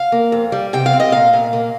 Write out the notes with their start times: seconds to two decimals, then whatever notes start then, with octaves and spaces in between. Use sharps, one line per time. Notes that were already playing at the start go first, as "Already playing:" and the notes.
Already playing: F5
0.12 A#3
0.32 F2
0.52 G3
0.73 C3 G5
0.86 F5
0.93 C4
1.00 D#5
1.12 A#2 F5
1.33 A#2
1.53 A#3